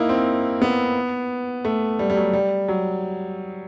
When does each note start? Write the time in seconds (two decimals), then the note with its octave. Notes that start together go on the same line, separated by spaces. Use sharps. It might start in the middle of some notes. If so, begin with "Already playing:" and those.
Already playing: A#3 D#4 E4
0.09 C4
0.62 B3
1.65 A3
1.99 G3
2.10 G3
2.17 F#3
2.33 G3
2.68 F#3